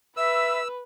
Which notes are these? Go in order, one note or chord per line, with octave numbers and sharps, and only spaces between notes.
B4 E5 E6